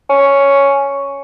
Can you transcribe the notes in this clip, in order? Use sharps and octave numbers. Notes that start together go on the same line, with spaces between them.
C#4